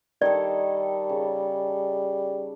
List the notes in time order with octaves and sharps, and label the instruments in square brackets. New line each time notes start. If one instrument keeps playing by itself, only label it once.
[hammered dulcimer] D#3 A4 [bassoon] G3 [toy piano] D5
[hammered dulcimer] C#3